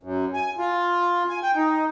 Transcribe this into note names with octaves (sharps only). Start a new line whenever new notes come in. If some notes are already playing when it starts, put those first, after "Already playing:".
F#2
G#5
F4
G#5
G5
D#4